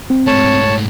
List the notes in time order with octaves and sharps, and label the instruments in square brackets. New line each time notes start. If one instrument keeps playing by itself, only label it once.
[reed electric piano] C4
[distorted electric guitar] G#2 A3 [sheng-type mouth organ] C#5 A5